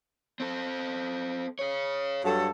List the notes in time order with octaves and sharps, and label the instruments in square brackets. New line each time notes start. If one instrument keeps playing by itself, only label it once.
[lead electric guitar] C4 A4
G#4 C#5
[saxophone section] G2 F#3 A4